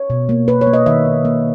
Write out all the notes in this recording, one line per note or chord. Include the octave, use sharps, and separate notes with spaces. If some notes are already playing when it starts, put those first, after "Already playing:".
Already playing: C#5
B2
A#3
A#3 B4
C#5
A#3
D#5
D#3 E5
D#3
A#3